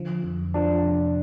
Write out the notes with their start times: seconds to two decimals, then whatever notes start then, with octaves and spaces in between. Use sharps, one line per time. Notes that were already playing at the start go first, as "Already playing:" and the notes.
Already playing: D3 F3
0.24 F2
0.54 F3 D4
0.85 C3